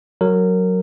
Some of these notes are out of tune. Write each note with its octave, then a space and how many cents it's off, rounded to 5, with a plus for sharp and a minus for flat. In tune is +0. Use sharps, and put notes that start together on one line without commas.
F#3 +0 A#4 -20